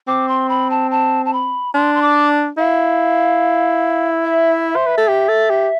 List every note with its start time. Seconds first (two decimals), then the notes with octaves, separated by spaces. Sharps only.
0.08 C4 D6
0.28 C6
0.49 B5
0.70 A5
0.91 A5
1.26 A5
1.33 B5
1.74 D4 C6
1.95 C6
2.02 D6
2.58 E4 F5
4.25 E5
4.76 C5
4.86 B4
4.98 A4
5.08 G4
5.28 A4
5.50 G4